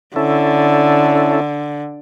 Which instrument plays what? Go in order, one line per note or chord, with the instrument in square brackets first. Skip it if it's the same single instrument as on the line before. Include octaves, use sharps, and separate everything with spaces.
[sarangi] D3 [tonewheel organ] C#4 E4 A4